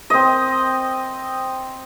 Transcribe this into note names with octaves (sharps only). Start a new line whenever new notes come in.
C4 D#5